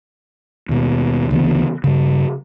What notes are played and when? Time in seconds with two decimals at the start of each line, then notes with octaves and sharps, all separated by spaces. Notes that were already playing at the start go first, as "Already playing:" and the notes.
0.69 D#2 B2
1.31 D2 C#3 E3 B3
1.84 G2 C#3